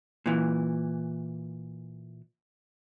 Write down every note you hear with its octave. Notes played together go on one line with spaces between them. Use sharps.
A#2 E3